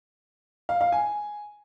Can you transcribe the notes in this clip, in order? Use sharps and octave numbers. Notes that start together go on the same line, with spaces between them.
F5
F5
G#5